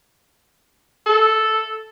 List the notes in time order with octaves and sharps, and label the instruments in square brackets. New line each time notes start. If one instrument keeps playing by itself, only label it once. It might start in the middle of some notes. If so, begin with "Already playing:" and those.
[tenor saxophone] A4